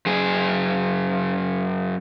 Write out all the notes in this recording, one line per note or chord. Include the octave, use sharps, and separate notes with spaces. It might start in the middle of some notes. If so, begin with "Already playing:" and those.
F#2 G#4